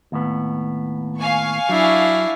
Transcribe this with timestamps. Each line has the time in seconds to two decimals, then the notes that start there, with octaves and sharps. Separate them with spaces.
0.12 D#2 A2 B3
1.17 F5 G#5 C#6
1.69 F#3 D4 E4